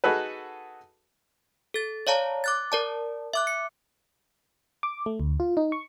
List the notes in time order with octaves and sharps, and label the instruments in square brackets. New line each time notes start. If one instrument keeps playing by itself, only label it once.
[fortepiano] D#4 F#4 G#4 A4 B4
[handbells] A4 A6
C#5 D5 F5 A5 A#5
D6 F#6 A6
A#4 D5 A5
E5 D6 F#6
C#7
[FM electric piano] D6
A3
D2
F4
D#4
C#6